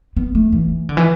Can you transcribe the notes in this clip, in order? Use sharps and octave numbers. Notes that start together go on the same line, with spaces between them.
B3
A3
E3
D3
E3